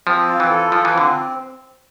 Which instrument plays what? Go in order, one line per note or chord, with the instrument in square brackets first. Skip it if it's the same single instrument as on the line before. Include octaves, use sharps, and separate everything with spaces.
[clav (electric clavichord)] F3 [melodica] C4
[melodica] F4
[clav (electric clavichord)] E3
[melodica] A4
[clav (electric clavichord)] F3 [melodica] F4
[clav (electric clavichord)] E3
[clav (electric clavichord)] D3 [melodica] C4